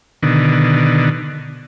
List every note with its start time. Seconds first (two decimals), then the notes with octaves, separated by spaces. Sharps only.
0.23 B2 D3 D#3